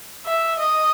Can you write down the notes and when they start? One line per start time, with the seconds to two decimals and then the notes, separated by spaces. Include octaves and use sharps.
0.26 E5
0.59 D#5